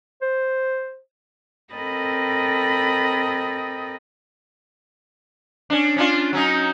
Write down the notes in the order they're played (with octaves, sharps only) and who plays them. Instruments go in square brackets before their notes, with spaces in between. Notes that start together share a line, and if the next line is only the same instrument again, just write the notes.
[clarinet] C5
[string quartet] C4 A4 A#4 D#5 G5 B5
[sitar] C#4 D4
C#4 D4 F4
F#3 C#4 D#4